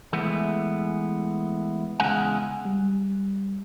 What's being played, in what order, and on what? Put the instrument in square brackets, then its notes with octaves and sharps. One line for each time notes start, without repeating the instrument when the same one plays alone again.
[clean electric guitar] E3 G#3 A3 B3
E2 C#3 G#3 F#5 G#5
[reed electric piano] G3